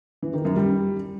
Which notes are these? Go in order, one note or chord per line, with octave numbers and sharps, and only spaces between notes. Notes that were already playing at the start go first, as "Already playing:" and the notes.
E3
D#3
F#2
G3